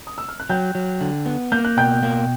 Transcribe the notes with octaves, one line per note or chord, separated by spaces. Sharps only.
D#6
E6
F6
F#6
F#3 G5 G6
F#3
D3
B3
A#3 G6
F#6
B2 G5 G6
A#3